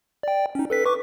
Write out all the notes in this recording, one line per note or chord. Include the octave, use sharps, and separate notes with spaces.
D5 G5
C#4 D#4
A4 B4 B6
B4 C#6 D6